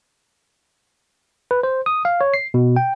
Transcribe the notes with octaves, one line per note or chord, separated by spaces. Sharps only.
B4
C5
D#6
F5
C#5
C7
B2
G5